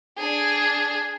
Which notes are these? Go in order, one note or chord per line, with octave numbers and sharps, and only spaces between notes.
D4 G#4